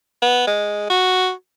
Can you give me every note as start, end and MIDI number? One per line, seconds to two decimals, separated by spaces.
0.22 0.46 59
0.47 0.90 56
0.90 1.31 66